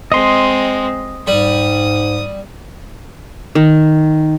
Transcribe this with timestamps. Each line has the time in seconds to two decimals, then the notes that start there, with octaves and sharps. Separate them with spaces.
0.12 G#3 C4 D#5 C6
1.27 G#2 G3 D#6
3.55 D#3